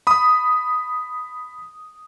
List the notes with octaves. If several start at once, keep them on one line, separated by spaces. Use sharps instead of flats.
B5 D#6